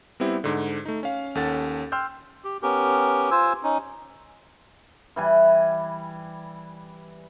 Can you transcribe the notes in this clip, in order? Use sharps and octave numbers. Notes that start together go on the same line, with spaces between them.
G3 B3 C4 E4 G4
G#2 D3
A3 D#4
C#4 F5
D#2 C#4 A4 F#5 A6
G5 C6 E6 F6 G6
G4
B3 C#4 G4 A#4
F4 C5 G#5 E6
C#4 D#4
E3 G3 G#5